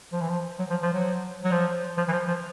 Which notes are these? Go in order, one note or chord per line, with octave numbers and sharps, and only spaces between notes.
F3
E3
F3
F#3
F3
F3
F#3
F#3
F3
F3
E3
F3
F3